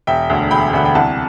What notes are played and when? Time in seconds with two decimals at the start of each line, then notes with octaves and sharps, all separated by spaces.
0.07 E1 E5 G5
0.30 D2 D3
0.51 E1 G5 B5
0.73 D2 D3 F#5
0.85 G5
0.95 C2 F#5 A5